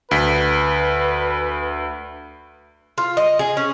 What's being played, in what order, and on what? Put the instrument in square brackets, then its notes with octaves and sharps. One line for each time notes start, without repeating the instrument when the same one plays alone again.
[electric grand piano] D2 B6 [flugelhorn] B4
[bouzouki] F4
D#5
G#4
C#4